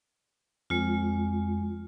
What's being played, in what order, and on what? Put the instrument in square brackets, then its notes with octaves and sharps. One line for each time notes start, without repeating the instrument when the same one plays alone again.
[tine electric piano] F2 [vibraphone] G#3 F4